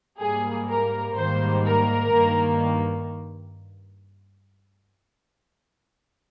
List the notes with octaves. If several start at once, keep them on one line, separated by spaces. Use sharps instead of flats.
G#2 G3 A#3 G#4
A#4
G#2 D#3 G3 A#3 C5
A#4
G2 D#3 A#3